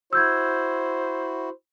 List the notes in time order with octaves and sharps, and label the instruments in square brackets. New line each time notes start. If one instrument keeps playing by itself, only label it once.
[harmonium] E4 F#4 [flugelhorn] C5 [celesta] E6 G6 G#6